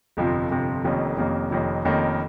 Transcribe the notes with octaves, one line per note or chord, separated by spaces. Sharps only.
G1 F2 C3 F3
G1 F2 C3 F3
F1 F2 D#3 A#3 C#4
F1 F2 D#3 A#3 C#4
F1 F2 D#3 A#3 C#4
F1 F2 D#3 A#3 C#4